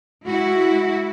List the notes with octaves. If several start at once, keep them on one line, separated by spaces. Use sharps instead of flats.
G#3 E4 F#4